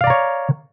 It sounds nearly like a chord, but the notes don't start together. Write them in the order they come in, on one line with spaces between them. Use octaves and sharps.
F5 D5 A#5 C#5